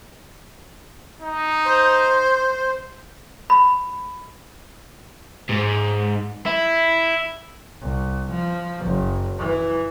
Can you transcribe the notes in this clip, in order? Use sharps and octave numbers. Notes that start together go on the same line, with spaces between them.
D#4
C5
B5
G#2
E4
C2
F3
F#1
E3